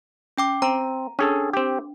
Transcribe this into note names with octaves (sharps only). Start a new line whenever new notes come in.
C#4 G5 D6
C4 A#5
C#4 D4 G#4 A4
C4 G4